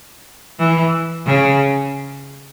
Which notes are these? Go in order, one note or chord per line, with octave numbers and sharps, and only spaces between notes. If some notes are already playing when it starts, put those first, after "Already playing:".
E3
C#3